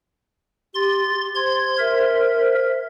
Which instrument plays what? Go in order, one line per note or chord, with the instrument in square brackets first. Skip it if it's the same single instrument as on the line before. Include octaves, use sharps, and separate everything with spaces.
[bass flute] G4 [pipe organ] C6 A6
[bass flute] C5 [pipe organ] C6 G#6
[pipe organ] A#4 E5